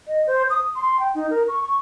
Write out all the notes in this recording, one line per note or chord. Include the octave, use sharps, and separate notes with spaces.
D#5
C5
D#6
C6
G5
D#4
A#4
C#6
C#6